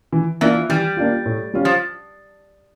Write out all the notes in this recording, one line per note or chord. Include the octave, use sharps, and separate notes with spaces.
E3
E3 A#3 D4 F4
E3 G3
A#3 D4 F4
A2
G3 C#4 F4
F3